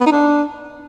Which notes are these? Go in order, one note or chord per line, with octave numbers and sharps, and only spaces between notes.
B3
D#4
D4